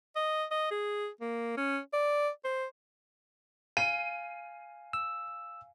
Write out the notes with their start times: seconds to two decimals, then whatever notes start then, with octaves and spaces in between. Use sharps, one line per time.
0.16 D#5
0.51 D#5
0.71 G#4
1.21 A#3
1.57 C#4
1.93 D5
2.44 C5
3.77 F5 G#5 D#7
4.93 E6